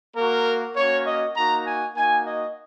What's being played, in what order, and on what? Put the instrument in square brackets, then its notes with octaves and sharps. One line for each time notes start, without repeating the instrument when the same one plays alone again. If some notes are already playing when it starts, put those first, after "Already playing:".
[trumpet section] A#3 F#4 A#4
A#3 C#4 F#4 C#5
D#5
A#3 D#4 F#4 A#5
G#5
A#3 D#4 F#4 G#5
D#5